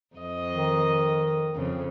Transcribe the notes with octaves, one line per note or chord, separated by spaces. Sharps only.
F2 D#5
D#3
F2 C#3